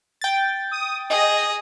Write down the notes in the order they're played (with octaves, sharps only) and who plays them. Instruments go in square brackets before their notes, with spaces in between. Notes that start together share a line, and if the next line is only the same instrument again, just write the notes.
[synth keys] G5 A6
[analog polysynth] D#6
[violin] G#4 [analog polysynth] D#5